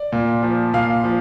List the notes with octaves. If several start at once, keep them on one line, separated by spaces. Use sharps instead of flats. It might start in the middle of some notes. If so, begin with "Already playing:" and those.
Already playing: D5
A#2
F3
A#2 F5
F3